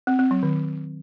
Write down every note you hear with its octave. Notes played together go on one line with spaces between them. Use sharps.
C4
C4
F#3
D#3